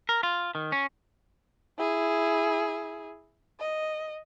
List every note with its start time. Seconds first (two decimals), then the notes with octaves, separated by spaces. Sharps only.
0.09 A#4
0.23 F4
0.55 D#3
0.72 C#4
1.78 E4 G#4
3.60 D#5